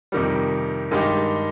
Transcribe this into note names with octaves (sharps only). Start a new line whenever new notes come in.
F2 C3 D#3 G3
G2 D#3 G#3 D#4 G4